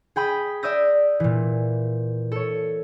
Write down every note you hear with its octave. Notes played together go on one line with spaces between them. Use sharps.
G#4 G5 B5 D#6
D5 E5 D#6 E6 G6 A#6
A#2 E3
A4 C#5